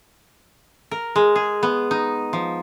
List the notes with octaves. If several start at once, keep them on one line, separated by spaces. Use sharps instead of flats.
A#4
G#3
G#4
B3
D#4
F3